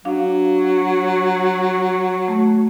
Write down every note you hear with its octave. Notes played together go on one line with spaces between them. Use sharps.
F#3 D4 F5
A3